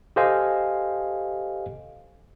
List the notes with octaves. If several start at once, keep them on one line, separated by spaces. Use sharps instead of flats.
G4 A4 C5 D#5 F5 G#5